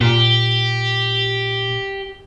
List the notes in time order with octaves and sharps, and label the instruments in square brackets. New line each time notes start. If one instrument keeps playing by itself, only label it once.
[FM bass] A#2 [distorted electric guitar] G4